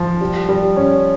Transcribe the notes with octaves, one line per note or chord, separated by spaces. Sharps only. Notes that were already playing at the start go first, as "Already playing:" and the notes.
Already playing: F3
G3
G3
C#4